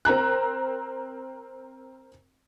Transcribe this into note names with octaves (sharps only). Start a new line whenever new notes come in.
C4 A#4 A#5 F#6